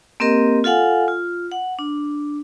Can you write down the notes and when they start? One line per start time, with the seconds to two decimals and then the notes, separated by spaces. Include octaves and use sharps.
0.20 A#3 C4 G4 A#4 D#5
0.64 F4 A4 F5 F#5 G#5
1.08 F4
1.52 F#5
1.79 D4